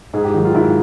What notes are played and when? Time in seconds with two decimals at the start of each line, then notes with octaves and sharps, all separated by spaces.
0.14 G#2 G#4
0.24 G4
0.34 D#3 F#3
0.45 F4
0.54 G#2 E4